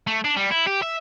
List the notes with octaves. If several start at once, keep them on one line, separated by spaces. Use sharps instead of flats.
A3
D4
G3
E4
G4
E5